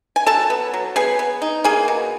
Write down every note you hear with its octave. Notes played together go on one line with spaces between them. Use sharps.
G#5
F#3 A4 A5
B3
F#3
B3 G#4 G#5
B3
D#4
A#3 G#4 G#5
B2